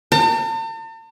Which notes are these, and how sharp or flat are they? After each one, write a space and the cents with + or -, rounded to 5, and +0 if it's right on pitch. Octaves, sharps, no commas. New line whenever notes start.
A5 +45